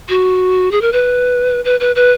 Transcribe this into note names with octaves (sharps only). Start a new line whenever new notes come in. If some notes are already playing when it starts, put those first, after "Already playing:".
F#4
G#4
A#4
B4
B4
B4
B4